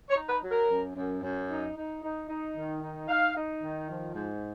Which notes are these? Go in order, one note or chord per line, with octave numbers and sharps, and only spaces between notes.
C#5
D#4
B4
F#3
A#4
F#2
F#2
F#2
D#4
D#4
D#4
D#4
D#3
D#4
D#4 F5
D#4
D#3
F3
G#2